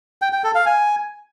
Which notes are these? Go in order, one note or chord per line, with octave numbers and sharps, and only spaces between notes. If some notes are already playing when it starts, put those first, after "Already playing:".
G5
G5
A4
F5
G#5